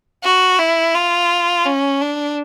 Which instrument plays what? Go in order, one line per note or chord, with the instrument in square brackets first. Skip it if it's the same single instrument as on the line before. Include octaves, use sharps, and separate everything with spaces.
[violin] F#4
E4
F4
C#4
D4